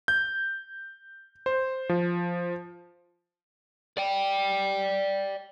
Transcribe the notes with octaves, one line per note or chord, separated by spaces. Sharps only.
G6
C5
F3
D5 G5